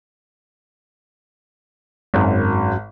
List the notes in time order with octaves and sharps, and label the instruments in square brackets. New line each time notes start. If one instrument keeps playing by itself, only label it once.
[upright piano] G#1 [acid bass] F#2